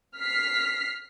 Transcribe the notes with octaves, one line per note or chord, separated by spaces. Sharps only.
F6 B6 C7